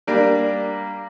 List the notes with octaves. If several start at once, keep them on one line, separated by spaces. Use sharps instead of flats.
G3 A#3 D4